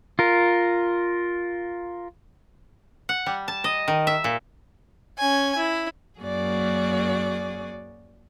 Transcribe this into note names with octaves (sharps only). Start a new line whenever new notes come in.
F4 A#4
F#5
G3
A5
D#5
D#3
E5
A#2
C#4 G#5
E4
F#2 F#3 A#3 F#4 G#4 D5